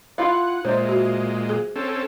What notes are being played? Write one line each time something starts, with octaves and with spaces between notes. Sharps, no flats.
E4 F4 F5 F#5
A#2 G#3 C5 D5 E5
F#4
G#4
C4 C#4 A4